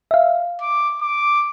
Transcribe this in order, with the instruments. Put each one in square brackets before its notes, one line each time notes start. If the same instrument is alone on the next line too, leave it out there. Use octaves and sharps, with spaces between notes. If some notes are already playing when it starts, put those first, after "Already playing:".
[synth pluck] E5 F5
[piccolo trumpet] D6
D6